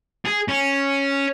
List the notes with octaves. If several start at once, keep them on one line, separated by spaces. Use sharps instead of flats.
G#4
C#4